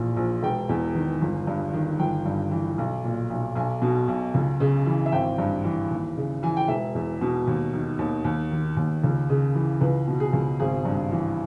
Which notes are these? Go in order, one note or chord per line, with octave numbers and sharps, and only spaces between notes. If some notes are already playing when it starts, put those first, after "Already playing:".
Already playing: A#1 A#2 E3
A#1
E1 G5
E2
D#3
G1
G2
D#3
G1 G5
G2
E3
B1
A#2
B1
B1 G#5
B2
B1
C#2
C#3
E3
E5
G#1 G5
G2
E3
D#2
C#3
E3 G#5
G5
E1 E5
E2
B2
D#2
D#3
D#2
D#2
D#3
D#2
C#2
C#3
E3
C#2 B4
B2
G#4
C#2
G#1 G#4
G2
E3